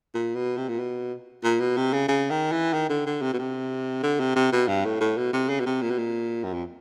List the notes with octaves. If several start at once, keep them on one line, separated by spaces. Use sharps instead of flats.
A#2
B2
C3
A#2
B2
A#2
B2
C3
C#3
C#3
D#3
E3
D#3
D3
D3
C3
B2
C3
D3
C3
C3
B2
G2
A2
A2
B2
C3
C#3
B2
C3
A#2
B2
A#2
F#2
F2